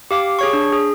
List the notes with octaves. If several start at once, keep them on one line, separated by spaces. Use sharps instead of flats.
G4 F5 D6
G#4 C#5 C#6
D4
G#4